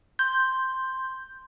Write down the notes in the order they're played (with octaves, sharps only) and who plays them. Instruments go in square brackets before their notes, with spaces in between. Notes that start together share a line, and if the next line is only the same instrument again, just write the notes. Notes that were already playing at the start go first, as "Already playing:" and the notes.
[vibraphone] C6 [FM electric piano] G6